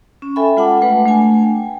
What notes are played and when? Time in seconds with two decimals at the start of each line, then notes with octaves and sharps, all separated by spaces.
0.22 C#4
0.36 A4 E5 G5 G#5 B5
0.57 G#3 F4 F#5 A5 D6
0.82 A3 B4 F#5
1.05 A3 D4 G#5
1.43 G5